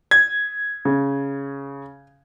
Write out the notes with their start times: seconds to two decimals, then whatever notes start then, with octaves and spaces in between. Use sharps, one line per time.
0.11 G#6
0.85 C#3